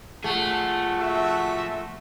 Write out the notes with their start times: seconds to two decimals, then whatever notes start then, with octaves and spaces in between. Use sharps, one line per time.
0.24 F3 A3 G#4 F#5
1.00 F#4 A4 E5